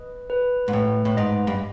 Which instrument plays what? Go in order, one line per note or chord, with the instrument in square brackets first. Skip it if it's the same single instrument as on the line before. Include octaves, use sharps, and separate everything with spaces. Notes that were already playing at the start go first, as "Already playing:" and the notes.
Already playing: [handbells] B4 D#5
B4
[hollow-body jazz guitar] G#2
[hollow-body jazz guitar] A2 [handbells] B4
[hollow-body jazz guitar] A2
[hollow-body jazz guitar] G#2 [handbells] D#5
[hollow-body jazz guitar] G2